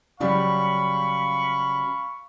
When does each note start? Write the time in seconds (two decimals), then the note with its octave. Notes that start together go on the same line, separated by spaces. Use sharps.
0.20 C#3 F#3 G3 F5 B5 C#6